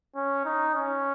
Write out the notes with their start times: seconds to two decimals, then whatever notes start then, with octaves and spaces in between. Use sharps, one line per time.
0.15 C#4
0.45 D#4
0.75 C#4